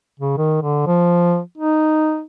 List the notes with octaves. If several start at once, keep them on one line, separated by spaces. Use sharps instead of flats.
C#3
D#3
D3
F3
D#4